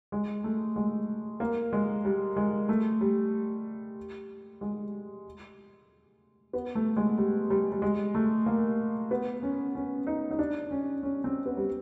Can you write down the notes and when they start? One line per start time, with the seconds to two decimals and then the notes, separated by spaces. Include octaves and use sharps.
0.12 G#3
0.44 A3
0.76 G#3
1.40 A#3
1.73 G#3
2.05 G3
2.36 G#3
2.69 A3
3.01 G3
4.61 G#3
6.53 B3
6.75 A3
6.96 G#3
7.18 G3
7.50 G3
7.72 G3
7.82 G#3
8.15 A3
8.46 A#3
9.11 B3
9.43 C#4
9.75 C#4
10.07 D#4
10.31 D#4
10.39 D4
10.71 C#4
11.03 C#4
11.24 C4
11.46 B3
11.57 G3